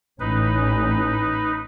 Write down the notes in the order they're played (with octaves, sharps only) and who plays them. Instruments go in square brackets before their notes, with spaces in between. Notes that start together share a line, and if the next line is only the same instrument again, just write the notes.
[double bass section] A1 C#4 [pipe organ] D#4 B4